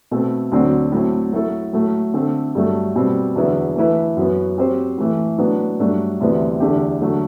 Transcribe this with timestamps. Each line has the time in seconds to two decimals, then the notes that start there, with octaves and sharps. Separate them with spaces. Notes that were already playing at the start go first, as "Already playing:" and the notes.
0.11 B2 A3 C4
0.52 D2 D3 F#3 C4
0.92 A2 F#3 C4
1.33 F#3 A3 E4 A4
1.73 A2 F#3 A3
2.14 D3 A3 C4
2.55 G2 F#3 A3
2.95 B2 G3 C4
3.36 E2 D3 F#3 B3 E4
3.76 E3 A3 E4 B4
4.17 F#2 F#3 B3
4.58 F#3 C4 G4 C5
4.98 A2 E3 A3
5.38 A2 F#3 B3 D4
5.79 G2 F#3 A3 D4
6.21 D2 C3 E3 B3
6.60 E2 D3 A3 D4 G4
7.01 D3 F#3 A3